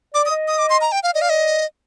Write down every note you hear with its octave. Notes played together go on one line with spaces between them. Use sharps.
D5 D6
D#6
D#5
D#6
D6
C6
A#5
G5
F5
D5 D#5
F5
D#5